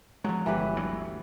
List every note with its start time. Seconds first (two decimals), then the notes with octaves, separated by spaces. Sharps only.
0.24 F3 F#3 G#3
0.46 G1 E3 G4 B4
0.76 D2 F#3